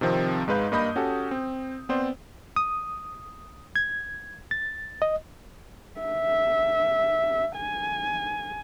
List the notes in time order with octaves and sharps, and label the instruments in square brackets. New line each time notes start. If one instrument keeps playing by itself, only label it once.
[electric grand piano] C3 D#3 F3 C4
G#2 G#3 D#4 B4 F5 G6
G2 A#3 D#5 B5 D#6 G6
C#4 F#4 G4 A4
C4
B3 C4 C5 D5
[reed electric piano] D#6
G#6
A6
D#5
[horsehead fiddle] E5
G#5